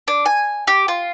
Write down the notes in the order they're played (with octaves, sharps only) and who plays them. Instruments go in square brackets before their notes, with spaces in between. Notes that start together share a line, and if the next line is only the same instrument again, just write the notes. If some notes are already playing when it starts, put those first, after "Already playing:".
[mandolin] D4
G#5
G4
F4